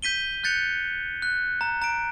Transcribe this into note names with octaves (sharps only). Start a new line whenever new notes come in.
G6 B6 D#7 G7
F#6 G6 A6 C#7 F7
F#6
A#5
A#5 D7